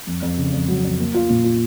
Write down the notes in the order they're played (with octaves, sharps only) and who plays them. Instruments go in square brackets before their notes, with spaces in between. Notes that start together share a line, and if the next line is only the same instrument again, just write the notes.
[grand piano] F2
F2
C#3
F2
F#3
F2
A#3
F4
A#2
F4